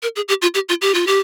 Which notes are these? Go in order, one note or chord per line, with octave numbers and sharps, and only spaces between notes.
A#4
G#4
G4
F4
G4
F4
G4
F4
G4